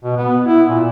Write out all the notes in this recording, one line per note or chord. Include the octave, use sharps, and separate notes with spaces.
B2
B3
E4
A#2